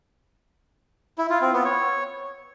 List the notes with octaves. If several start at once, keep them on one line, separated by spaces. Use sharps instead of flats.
E4
F4
C4
B3
C#5